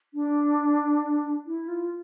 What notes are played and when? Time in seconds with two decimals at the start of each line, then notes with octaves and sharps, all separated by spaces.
0.14 D4
1.47 E4
1.68 F4